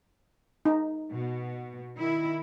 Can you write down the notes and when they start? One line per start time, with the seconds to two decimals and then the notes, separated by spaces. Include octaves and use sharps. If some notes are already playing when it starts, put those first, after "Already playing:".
0.65 D#4
1.12 B2
1.97 D#3 E4